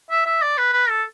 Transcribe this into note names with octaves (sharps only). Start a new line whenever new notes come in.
E5
E5
D5
B4
B4
A4